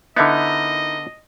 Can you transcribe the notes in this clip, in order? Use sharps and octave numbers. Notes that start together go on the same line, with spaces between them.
D3 B3 D#4 E4 A#4 D#5